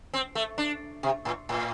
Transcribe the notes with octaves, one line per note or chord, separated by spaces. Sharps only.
C4
A3
D4
C3
A2
A2